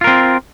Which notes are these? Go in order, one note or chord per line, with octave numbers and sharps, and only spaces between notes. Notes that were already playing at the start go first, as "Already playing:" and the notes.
C4 F4 A#4